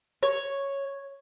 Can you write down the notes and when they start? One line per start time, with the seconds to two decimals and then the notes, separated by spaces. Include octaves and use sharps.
0.23 C#5